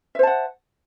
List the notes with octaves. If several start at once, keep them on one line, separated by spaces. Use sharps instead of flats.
C5 E5 F#5 A5